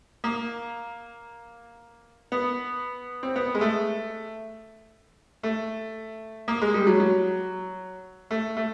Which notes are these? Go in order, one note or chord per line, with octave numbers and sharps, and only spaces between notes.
A#3
B3
C4
B3
G#3
A3
A3
A#3
G#3
G3
F#3
F#3
A3
A3